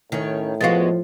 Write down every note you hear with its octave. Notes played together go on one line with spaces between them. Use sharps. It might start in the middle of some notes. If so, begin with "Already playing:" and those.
A2 D#3 C#4
F3 G#3 B3 F#4 F5 A6